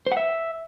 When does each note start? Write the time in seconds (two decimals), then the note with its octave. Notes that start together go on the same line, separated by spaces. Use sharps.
0.07 C5
0.12 F#5
0.17 E5